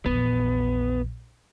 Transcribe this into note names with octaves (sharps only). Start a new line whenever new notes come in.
A#1 E2 B3